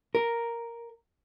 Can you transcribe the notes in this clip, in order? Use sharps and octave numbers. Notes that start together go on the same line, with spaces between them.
A#4